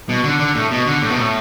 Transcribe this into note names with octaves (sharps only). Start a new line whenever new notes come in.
B2
D3
D3
A2
B2
D3
A2
B2
A2